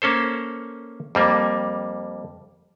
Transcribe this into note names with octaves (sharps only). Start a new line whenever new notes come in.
A#3 C#4 A4 C5
F2 G3 A#3